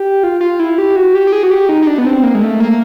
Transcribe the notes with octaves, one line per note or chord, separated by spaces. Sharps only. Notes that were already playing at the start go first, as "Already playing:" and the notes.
Already playing: G4
F4
F4
E4
G4
F#4
G4
G4
G#4
F#4
G4
D#4
D#4
D4
B3
C4
A#3
G#3
A3
A#3